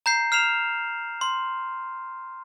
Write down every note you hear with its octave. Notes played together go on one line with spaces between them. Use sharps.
A#5 G6 C7
F6 C7 E7 F7
C6